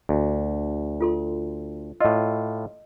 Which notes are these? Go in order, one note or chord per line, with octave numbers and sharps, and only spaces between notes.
D2
F4 A4 C6
A2 F4 D#5 E6